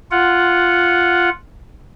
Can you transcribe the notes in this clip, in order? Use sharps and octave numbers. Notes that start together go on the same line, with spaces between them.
F4 F#5